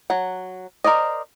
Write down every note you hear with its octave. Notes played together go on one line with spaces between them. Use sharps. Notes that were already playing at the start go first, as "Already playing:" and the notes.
F#3 F#5
A#4 C5 D5 D#5